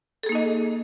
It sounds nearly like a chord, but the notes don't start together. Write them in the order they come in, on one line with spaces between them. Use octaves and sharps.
A4 G#4 A#3 D#4 D#5